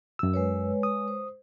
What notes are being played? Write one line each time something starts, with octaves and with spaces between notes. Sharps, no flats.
F#2 E6
G#3 B4 C#5
D#6
C5